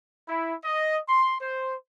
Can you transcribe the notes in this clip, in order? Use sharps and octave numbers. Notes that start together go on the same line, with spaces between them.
E4
D#5
C6
C5